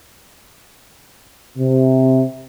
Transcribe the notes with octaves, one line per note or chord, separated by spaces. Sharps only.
C3